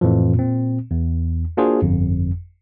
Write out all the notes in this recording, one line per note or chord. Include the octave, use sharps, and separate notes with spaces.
F2 A2 E3 F3
A#2 C4
E2
A#3 D4 F4 F#4 G#4 C5
G1 F2